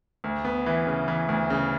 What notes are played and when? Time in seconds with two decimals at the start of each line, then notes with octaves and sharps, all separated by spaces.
0.24 D2
0.44 B3
0.66 E3
0.87 C#3
1.08 E3
1.29 D2
1.50 C#3